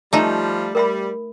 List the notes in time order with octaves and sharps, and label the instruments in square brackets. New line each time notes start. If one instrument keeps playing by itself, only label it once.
[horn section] F3 G3 [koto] A3 D#4 [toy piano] D#5 G#5 A#5
[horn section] G3 [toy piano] A#4 E5 B5